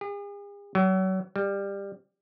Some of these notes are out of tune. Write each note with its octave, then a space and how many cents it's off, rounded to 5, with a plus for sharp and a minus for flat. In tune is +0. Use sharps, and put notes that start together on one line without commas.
G#4 -45
F#3 +35
G3 +20